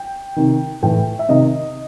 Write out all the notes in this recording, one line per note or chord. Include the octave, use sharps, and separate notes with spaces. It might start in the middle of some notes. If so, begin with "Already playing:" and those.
Already playing: G5
C3 D#3
A2 E3 G5
E5
C3 D#3 D#5